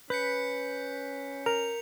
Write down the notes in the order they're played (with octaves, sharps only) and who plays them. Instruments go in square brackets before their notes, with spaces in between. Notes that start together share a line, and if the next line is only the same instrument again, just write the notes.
[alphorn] C#4 [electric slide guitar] B4 [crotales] G6 B6 C#7
[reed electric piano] A#4 [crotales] F7